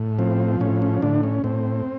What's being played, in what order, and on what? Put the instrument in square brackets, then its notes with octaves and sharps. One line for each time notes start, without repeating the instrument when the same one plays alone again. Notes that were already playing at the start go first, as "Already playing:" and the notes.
Already playing: [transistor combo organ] A2
F3 C4
A2 C#4
C#4
A2 D3 D4
C#4
A2 C4